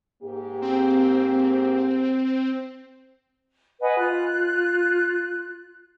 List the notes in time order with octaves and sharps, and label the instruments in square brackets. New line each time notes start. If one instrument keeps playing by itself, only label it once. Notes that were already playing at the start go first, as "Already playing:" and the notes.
[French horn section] G#2 A#3 G4
[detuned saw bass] C4
[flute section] B4 D#5 F#5 G#5
F4 F#6